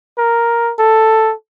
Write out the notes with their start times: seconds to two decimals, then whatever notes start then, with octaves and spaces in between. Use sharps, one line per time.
0.18 A#4
0.79 A4